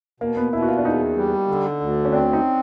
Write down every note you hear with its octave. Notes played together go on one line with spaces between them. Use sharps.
B2 A#3
B3
B2 E4
F#4
F4
D4
E2 D#4
G3
D3
D2
C#4
C4 D4
D#4